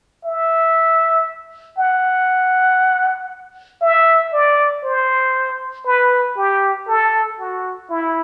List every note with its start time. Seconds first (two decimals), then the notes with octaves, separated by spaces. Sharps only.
0.25 E5
1.77 F#5
3.81 E5
4.33 D5
4.84 C5
5.86 B4
6.37 G4
6.88 A4
7.39 F#4
7.90 E4